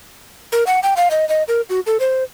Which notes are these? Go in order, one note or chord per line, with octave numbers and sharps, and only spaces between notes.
A#4
F#5
G5
F5
D#5
D#5
A#4
F#4
A4
C5